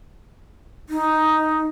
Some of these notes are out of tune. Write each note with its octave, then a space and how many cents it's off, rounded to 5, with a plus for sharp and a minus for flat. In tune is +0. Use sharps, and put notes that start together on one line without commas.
D#4 +5